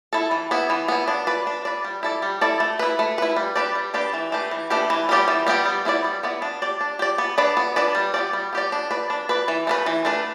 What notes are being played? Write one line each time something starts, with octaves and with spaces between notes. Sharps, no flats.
E4 A4
E3
B3 E4
E3
B3 E4
D4
B4 D5
D4
B4 D5
G3
E4 A4 D5
G3
E4 A4 D5
A3
E4 B4
A3
E4 B4
G3
D4 G4 B4 D5
G3
D4 G4 B4 D5
E3
A3 D4 G4 B4
E3
A3 D4 G4 B4
E3
G3 B3 G4 D5
E3
G3 B3 G4 D5
G3
B3 E4 B4 D5
G3
B3 E4 B4 D5
D4
G4 D5
D4
G4 D5
B3
D4 B4 D5
B3
D4 B4 D5
G3
B3 G4 D5
G3
B3 G4 D5
D4
B4 D5
D4
B4 D5
E3
A3 D4 B4
E3
A3 D4 B4